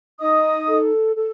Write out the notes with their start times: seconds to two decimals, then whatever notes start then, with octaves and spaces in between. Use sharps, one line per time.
0.20 D#4 D#5 D#6
0.67 A4
1.15 A4